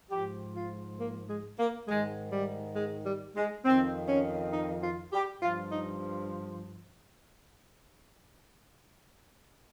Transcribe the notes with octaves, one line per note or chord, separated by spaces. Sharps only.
G#2 F3 G4
F4
A#3
G#3
A#3
G#2 D#3 G#3
G3
G#3
G3
G#3
F2 D#3 C4
C#4
D#4
F4
G4
G2 F3 F4
D#4